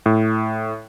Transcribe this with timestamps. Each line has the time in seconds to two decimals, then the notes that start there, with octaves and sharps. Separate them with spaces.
0.06 A2